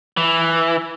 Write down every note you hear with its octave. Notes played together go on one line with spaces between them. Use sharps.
E3